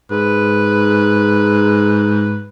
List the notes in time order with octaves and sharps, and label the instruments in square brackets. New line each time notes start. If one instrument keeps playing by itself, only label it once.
[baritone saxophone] G#2 [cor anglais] B4